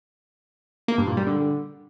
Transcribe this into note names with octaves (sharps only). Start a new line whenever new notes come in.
A#3
G2
A#2
G3
D3